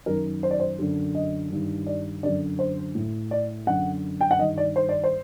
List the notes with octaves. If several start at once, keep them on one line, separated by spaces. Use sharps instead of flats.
F#2 D#3 A#4
C5
D5
C5
F#2 D3
D#5
G2 D#3
D5
F#2 D3 D5
C5
A2
D5
F#2 D3 F#5
G5
F#5
G2 D#3 D#5
D5
C5
D5
C5